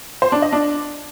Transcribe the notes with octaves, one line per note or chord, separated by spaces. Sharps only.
C5
D4
D#5
D4